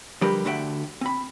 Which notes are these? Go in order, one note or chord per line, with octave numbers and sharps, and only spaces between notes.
D3 F3 G3 G4 A#4 B4
D2 D3 F#4 E5 F#5 G5
C4 B5